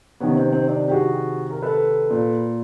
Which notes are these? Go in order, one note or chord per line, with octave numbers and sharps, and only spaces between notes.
C3 D#3 B3 C#4
C4
C4
C4 D4
G4
F#4 G#4
A#4
A4 B4
A#2